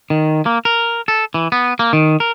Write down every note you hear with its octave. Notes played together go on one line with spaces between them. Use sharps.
D#3
A#3
A#4
A4
E3
B3
A#3
D#3
A#4